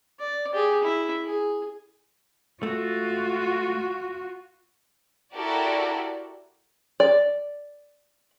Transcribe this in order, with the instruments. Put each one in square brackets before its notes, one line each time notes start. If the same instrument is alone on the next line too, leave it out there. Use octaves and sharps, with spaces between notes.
[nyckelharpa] D5
G4 G#4
E4
G#4
[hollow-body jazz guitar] A3 [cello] F4 F#4
[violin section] E4 F#4 G4 A4 A#4 D5
[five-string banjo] D5